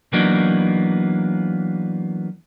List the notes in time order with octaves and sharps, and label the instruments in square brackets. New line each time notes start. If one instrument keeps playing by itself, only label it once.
[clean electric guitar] E3 F#3 A#3 B3 D4 D#4